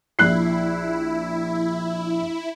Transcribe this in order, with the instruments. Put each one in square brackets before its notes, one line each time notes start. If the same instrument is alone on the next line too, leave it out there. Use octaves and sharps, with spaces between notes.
[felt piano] A#1 F#6 C7 [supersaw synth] E4